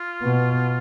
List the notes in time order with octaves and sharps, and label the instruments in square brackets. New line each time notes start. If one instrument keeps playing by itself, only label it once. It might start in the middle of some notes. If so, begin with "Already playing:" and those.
Already playing: [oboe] F4
[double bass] B2